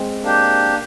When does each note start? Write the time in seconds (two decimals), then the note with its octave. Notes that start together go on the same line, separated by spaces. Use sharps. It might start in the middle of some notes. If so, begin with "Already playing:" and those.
Already playing: G#3 C4
0.23 A#3 D4 G4